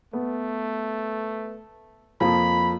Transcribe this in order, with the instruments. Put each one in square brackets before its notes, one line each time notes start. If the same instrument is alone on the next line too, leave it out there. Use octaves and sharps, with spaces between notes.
[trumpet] A3 [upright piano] B3
[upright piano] F2 F3 A#3 [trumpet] B5